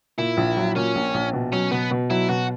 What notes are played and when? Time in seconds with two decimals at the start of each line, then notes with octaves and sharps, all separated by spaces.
0.18 A#2 E4
0.37 A#1
0.57 F#3
0.76 A#2 C#4
0.95 A#1
1.14 A#1
1.33 B2
1.52 F#3 C#4
1.71 B2 B3
1.91 B2
2.10 F#3 E4
2.29 B2 F#4